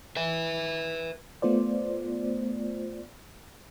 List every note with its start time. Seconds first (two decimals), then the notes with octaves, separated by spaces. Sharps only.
0.16 B4 E5
1.42 A3 B3 F4 C5 D5